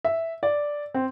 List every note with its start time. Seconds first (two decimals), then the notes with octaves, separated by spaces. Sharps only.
0.05 E5
0.43 D5
0.94 C4